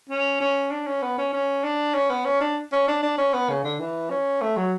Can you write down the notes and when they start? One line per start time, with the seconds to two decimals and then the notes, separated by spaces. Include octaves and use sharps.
0.09 C#4
0.40 C#4
0.71 D4
0.87 C#4
1.02 B3
1.18 C#4
1.33 C#4
1.64 D4
1.94 C#4
2.10 B3
2.25 C#4
2.41 D4
2.72 C#4
2.88 D4
3.03 D4
3.18 C#4
3.34 B3
3.50 C#3
3.64 D3
3.80 E3
4.10 C#4
4.42 A3
4.57 F#3